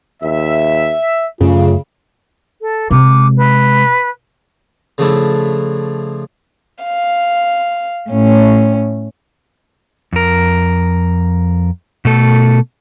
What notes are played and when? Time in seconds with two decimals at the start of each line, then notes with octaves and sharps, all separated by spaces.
0.23 D#2 E5
1.41 F#2 C#3 A3 F4
2.61 A4
2.91 C3 G#3 D6
3.37 B4
4.98 C#3 F3 A3 D4 E4
6.84 F5
8.11 A2 C#4
10.13 F2 A#4
12.05 B2 A3 A4